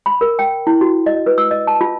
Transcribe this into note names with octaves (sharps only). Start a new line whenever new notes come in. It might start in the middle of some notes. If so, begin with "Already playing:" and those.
B5
A#4
G5
E4
F#4
D#5
B4
E6
D#5
A5
F4